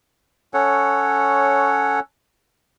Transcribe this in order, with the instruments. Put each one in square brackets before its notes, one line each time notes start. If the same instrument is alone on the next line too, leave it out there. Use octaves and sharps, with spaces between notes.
[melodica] C#4 A4 C#5 F#5